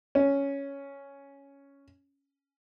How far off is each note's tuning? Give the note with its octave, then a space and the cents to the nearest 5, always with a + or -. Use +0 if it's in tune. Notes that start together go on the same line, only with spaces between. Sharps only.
C#4 +5